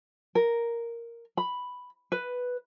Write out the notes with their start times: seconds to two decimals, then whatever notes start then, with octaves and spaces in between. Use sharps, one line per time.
0.35 A#4
1.37 B5
2.12 B4